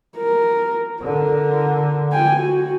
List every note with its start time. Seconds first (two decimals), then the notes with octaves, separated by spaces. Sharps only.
0.17 A#4
1.02 D3 A#4
2.12 G5 G#5
2.40 F#4